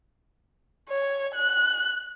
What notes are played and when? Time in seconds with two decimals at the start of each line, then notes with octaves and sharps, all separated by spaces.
0.89 C#5
1.35 F#6